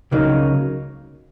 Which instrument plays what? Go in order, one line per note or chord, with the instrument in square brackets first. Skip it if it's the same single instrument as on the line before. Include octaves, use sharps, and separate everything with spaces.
[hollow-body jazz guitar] C#2 C#3 F#3 A#3 D#4